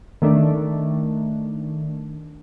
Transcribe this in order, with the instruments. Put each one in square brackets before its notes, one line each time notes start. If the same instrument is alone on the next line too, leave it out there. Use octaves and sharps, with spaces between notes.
[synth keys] D#3 A3 D4